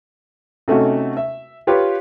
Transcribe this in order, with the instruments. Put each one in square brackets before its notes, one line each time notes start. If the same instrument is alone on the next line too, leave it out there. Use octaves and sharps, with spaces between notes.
[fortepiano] C3 A3 C#4 D#4 F#4
E5
F4 G4 B4 C#5